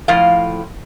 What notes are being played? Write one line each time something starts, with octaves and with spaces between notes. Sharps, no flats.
A2 F3 F5